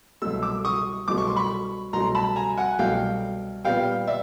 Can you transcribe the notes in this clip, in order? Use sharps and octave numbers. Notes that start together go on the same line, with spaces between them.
C2 B2 F#3 A3 E6
D6 E6
C#6 D#6
C2 B2 F#3 A3 D6
C#6
C6
B5 C#6
C2 B2 F#3 A3 A#5 C6
A5 B5
G#5 A#5
F#5 G#5
C2 B2 F#3 A3 F5 G5
A#2 G3 B3 F5 G5
D5 E5